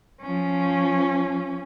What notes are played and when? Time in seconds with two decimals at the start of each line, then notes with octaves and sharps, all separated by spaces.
0.21 F3 C#4